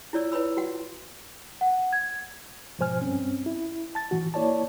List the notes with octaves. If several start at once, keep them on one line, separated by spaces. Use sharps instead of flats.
E4 F4 C#5 D5 E6
E4 B4 C#5 B5 E6
F4 F#4 F#5
F#5
G#6
G#2 B2 F3 C5 G#5 F6
G2 C4 C#4
E4
A5 A6
A2 E3 F#4
A#3 E4 C#5 D5 A5